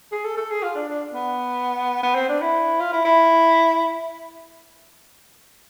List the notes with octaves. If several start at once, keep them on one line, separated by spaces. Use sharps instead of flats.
G#4
A4
A4
G#4
F4
D4
D4
B3
B3
C4
D4
E4
F4
E4
E4